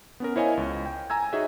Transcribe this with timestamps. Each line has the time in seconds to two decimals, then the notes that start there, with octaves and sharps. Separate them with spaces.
0.20 B3 C#4 A#4
0.36 E4 C5 C#5 D#5 F5 G#5
0.57 C#2
0.86 G5
1.10 G#5 A#5 E6 G#6
1.33 D#4 F#4 G#4 C#5 D#5 E5